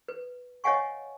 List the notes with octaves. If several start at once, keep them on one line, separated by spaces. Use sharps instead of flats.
B4
C#5 D#5 F5 F#5 G#5 C#6